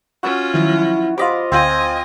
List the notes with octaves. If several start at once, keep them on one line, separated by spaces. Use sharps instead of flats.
C#4 F4 F#4 E6
D#3 F3 F#3 E4
F4 G4 C5 D#5 B5 D6
D2 C4 F4 D#5 G#5